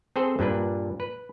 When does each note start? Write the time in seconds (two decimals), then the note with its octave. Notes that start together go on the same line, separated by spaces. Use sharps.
0.16 C4 G#4 A4 C5
0.39 G2 A#2 D4 B4
1.00 B4